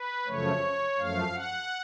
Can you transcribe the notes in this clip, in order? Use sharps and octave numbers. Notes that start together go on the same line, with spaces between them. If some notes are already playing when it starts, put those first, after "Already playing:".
Already playing: B4
F#2 C#3 F3 A3 C#5
F#2 F3 A3 F5
F#5